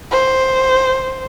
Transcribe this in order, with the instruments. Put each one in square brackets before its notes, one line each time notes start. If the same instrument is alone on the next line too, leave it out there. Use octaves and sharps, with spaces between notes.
[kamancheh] C5